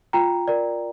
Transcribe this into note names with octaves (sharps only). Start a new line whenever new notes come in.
F4 G5 A#5
A#4 D5